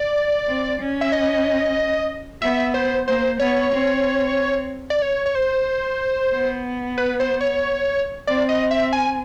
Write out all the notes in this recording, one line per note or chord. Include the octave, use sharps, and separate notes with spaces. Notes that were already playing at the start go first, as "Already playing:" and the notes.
Already playing: D5
C4
C#4
E5
D#5
B3 E5
C5
A#3 C5
B3 C#5
C4
D5
C#5
C#5
C5
B3
B4
C5
C#5
C4 D5
D#5
E5
G#5